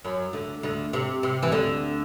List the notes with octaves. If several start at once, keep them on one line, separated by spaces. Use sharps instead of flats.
F#2 F#3
D2 D3
D2 D3
C3
C3
E3
D2 D3